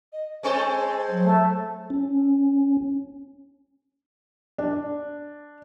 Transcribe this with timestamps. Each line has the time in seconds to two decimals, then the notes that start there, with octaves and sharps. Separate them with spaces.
0.13 D#5
0.43 G#3 C4 A4 C5
1.10 F#3
1.24 A3
1.90 C#4
4.58 D4